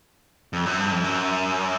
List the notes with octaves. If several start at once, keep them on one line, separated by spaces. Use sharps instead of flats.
F2
F#2
G2
F2
F#2